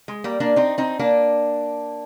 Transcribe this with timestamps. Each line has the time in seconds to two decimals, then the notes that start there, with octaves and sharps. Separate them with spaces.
0.08 G#3
0.24 G3 A#3
0.40 A#3 D4
0.56 C4 D#4
0.78 C4 D#4
0.99 A#3 D4